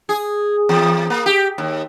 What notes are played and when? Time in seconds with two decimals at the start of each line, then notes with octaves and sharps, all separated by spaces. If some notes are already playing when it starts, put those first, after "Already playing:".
0.09 G#4
0.69 E2
1.10 A#3
1.26 G4
1.58 D#2